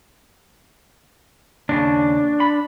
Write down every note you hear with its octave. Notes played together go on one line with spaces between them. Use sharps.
D#2 A#2 C#3 D4
B5